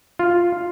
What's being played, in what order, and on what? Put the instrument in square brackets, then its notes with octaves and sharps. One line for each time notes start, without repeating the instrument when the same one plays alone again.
[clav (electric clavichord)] F4